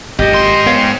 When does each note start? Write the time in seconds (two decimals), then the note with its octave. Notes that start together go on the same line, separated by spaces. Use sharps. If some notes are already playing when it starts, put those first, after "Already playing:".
0.19 G#1 F#2 A#2 G4 D#5
0.33 G#2 C6
0.66 B3 C#5 F5 G5